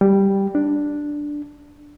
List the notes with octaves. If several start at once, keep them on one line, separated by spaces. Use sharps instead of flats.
G3
D4